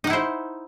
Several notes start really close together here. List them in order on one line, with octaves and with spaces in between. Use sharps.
D#4 F#5 E4 C5